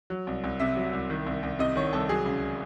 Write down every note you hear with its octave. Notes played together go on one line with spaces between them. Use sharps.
F#3
C2
C2
C3 E5
F#3
C2
D#3
C2
C2
C3 D#5
D#3 C#5
C2 A4
F#3 G#4
C#2